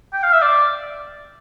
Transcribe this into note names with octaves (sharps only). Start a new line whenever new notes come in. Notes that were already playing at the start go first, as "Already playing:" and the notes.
G5
F5
E5
D5